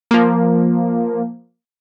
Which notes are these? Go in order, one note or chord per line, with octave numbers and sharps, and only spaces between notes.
F3 A#3